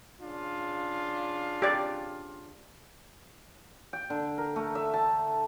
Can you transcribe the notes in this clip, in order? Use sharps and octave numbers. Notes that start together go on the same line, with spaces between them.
C#3 D4 F4
G4 D5
G5
D3
A#4
A3
E5
A5